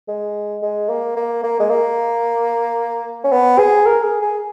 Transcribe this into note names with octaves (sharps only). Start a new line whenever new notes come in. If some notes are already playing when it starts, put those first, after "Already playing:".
G#3
G#3
A#3
A#3
A#3
G#3
A#3
C#4
B3
G#4
A#4
G#4
G#4